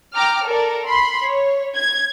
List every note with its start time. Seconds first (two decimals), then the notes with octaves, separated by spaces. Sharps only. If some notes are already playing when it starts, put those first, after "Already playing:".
0.14 G5 A#5 D6 F6
0.46 A4 A#4 D5
0.86 B5 C6
1.23 C#5
1.76 G#6